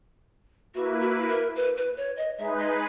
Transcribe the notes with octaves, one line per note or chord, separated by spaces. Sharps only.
A#3 E4 F#4 B4
F#4
A#4
B4
B4
C#5
D#5
G#3 D#4 G#4 B4 E5
D#5